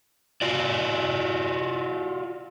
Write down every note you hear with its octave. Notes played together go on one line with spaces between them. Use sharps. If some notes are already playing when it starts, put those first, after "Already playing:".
F4 F#4 D5